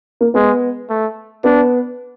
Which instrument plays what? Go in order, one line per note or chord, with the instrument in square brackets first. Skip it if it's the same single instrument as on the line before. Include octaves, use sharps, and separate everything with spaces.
[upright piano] A#3
[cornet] G#3 [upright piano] B3
[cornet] A3
[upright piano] B3 [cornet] D4